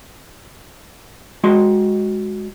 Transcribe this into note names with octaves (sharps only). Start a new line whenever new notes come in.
G#3 F#4 C6